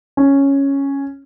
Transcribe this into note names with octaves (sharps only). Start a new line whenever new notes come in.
C#4